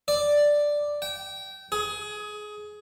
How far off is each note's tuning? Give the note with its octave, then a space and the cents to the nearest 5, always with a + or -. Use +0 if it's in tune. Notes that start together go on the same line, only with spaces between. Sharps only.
D5 +0
G5 -25
G#4 +20